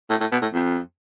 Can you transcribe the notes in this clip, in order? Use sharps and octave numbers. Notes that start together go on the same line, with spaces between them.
A2
A2
B2
A2
F2